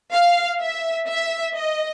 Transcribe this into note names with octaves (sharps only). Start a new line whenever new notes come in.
F5
E5
E5
D#5